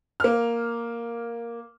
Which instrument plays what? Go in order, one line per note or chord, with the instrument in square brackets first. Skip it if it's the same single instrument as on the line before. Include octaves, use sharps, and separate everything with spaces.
[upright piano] A#3 F6